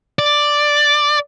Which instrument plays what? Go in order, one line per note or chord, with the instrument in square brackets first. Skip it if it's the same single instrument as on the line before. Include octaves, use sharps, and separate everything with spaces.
[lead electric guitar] D5